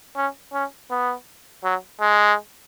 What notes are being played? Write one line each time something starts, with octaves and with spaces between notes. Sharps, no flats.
C#4
C#4
B3
F#3
G#3